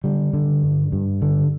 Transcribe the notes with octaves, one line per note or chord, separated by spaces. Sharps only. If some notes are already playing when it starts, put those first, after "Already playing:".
D3 G3
D3
G2
G2
D3